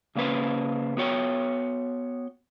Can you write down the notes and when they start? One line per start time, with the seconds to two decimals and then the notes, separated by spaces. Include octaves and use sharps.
0.15 C#3 A#3 C#4 B4 C5
0.97 B3 F#4 C#5 G5